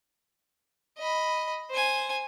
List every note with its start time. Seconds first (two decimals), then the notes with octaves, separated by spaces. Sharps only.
0.98 D#5 B5
1.70 C5 G#5